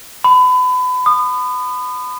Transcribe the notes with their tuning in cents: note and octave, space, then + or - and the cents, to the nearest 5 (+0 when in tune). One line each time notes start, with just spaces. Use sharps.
B5 +30
D#6 -30